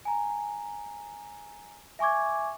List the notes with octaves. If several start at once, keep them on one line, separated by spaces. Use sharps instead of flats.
G#5 A#5
E5 G#5 C#6 D6 G#6